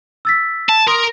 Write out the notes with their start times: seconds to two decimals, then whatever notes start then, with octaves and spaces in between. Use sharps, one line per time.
0.25 E6 A6 B6
0.69 A5
0.88 A#4 C6 D#6